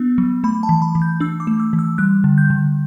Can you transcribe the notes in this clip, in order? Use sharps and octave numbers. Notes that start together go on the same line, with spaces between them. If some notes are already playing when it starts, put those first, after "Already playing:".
Already playing: B3 D4
F#3
A3 B5
A5
E3
B5
E3
G6
D4 E6
D6
A3
E6
E3
E6
G3 F#6
D3
G6
D3